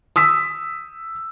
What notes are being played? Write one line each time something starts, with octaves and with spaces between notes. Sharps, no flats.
D#6 E6 B6